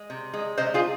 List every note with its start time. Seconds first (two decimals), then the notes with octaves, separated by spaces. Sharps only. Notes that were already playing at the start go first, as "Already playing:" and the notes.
Already playing: G#3
0.10 C3
0.34 G#3
0.57 C3 C5 D#5
0.74 F4 G#4